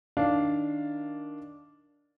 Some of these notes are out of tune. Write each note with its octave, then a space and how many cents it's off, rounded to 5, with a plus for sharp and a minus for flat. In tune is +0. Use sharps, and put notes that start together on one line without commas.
D#3 +0 D4 -10 F5 +0